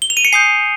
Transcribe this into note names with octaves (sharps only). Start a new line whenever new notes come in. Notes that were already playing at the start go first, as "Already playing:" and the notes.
G7
F7
D#7
C#7
G#5 D#6 G6 C7